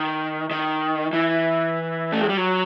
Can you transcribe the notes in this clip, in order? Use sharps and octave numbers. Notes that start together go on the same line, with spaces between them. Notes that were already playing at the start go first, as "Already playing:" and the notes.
Already playing: D#3
D#3
E3
A3
G#3
G3
F#3